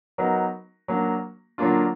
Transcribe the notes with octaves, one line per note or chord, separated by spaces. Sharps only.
F#3 B3 D#4 F#4 A#4
F#3 A#3 D4
D3 F#3 A#3 D4 F4